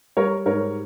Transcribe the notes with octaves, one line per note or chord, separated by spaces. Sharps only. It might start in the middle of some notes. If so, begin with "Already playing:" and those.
G3 A#4 C#5
G#2 A#4 C#5